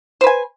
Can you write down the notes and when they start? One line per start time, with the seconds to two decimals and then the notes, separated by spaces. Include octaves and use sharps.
0.21 C5
0.24 B4
0.27 G#5